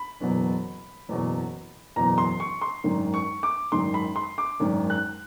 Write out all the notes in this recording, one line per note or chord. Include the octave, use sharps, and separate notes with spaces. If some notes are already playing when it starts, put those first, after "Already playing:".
Already playing: B5
F#1 E2 B2 F#3
F#1 E2 B2 F#3
F#1 E2 B2 F#3 A#5
C6
C#6
C6
G#1 F#2 D#3
C#6
D6
G#1 F#2 D#3 C6
B5
C6
D6
G#1 F#2 D#3
F#6